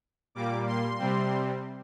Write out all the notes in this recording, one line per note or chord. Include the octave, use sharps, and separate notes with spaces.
A#2 G3 A#3 D6
C6
C3 G3 C4